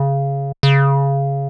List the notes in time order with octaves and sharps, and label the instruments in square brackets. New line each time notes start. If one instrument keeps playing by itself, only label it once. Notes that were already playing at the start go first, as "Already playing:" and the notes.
Already playing: [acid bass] C#3
C#3